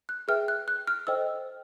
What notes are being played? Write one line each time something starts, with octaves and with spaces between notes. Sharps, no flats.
F#6
G#4 B4 E5 G5 F6
F#6
F#6
F6
A4 C5 D#5 G5 E6